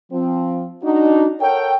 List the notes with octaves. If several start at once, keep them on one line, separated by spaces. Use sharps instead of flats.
F3 C4
D4 D#4 F#4
A4 A#4 C#5 F#5 G5